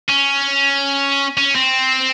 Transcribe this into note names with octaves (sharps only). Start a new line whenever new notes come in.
C#4
C#4
C4